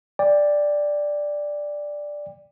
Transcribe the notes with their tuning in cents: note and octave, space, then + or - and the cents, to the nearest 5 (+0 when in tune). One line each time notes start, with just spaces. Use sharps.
D5 +0 G5 +25